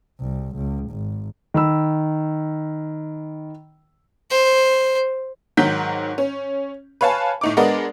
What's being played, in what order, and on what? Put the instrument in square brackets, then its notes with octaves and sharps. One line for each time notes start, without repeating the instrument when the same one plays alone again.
[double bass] C2
C#2
G#1
[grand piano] D#3 B5 E6
[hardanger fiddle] C5
[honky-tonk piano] G#2 D#3 F#3 G6 B6
C#4
B4 C#5 F5 G#5 A5
A2 D#4 D6
G#3 B3 D4 A#4 D5 D#5